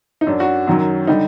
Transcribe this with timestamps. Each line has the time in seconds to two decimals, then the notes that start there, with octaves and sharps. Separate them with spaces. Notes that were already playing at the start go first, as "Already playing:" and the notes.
0.21 D#4
0.27 F#2 F#3 D4
0.40 F#4
0.67 F#2 D#3 F#3
1.07 D3 G3 D#4